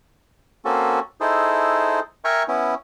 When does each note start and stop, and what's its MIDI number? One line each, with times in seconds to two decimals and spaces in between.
0.65 1.00 58
0.65 1.00 60
0.65 1.00 61
0.65 1.00 66
0.65 1.00 69
1.21 2.00 63
1.21 2.00 64
1.21 2.00 68
1.21 2.00 69
1.21 2.00 72
2.25 2.43 70
2.25 2.43 76
2.25 2.43 79
2.25 2.43 80
2.25 2.43 82
2.25 2.43 85
2.48 2.74 59
2.48 2.74 61
2.48 2.74 64